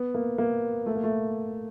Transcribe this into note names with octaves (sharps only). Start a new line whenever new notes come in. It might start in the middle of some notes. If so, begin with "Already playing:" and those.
Already playing: B3
A#3
A#3
A3
A#3
A3